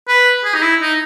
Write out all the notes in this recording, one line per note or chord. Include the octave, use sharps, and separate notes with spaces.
B4
G#4
D#4
E4
D#4